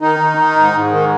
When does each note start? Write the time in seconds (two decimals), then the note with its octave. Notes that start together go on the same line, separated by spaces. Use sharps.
0.01 D#3 D#4
0.20 D#3
0.37 D#3
0.56 G#2
0.73 G#2
0.91 D#3